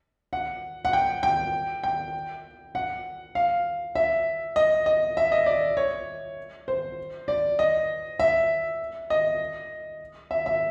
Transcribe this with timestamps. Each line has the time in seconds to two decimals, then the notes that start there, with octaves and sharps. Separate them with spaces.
0.33 F#5
0.85 F#5
0.93 G5
1.23 G5
1.84 G5
2.75 F#5
3.35 F5
3.95 E5
4.56 D#5
4.86 D#5
5.17 E5
5.32 D#5
5.46 D5
5.77 C#5
6.68 C5
7.28 D5
7.59 D#5
8.19 E5
9.10 D#5
10.31 E5
10.46 E5